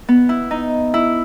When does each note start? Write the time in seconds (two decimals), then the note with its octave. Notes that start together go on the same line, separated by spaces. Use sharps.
0.09 B3
0.29 E4
0.51 D#4
0.94 E4